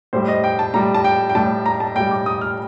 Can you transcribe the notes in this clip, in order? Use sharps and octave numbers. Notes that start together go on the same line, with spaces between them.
A2 G3 C5
D#5
G5
A5
A2 G3 A#5
A5
G5
G5
A2 G3 A5
A#5
A5
A2 G3 G5
D6
D#6
F6